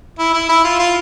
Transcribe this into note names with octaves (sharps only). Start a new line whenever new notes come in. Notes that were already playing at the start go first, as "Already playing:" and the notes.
E4
E4
E4
F4
F4